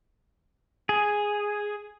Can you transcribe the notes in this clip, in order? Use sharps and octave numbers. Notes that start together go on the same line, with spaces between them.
G#4